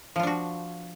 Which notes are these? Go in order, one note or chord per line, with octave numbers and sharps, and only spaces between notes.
F3 D4 F4 F#4